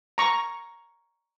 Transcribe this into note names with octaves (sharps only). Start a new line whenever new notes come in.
A#5 C#6